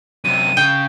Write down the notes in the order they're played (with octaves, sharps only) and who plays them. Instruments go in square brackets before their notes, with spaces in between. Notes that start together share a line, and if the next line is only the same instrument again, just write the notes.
[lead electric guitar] F#2 C3 [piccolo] D#7
[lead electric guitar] C#3 [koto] G5